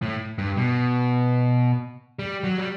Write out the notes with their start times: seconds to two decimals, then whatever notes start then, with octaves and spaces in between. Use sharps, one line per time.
0.02 A2
0.38 G2
0.57 B2
2.19 G3
2.44 F#3
2.58 G3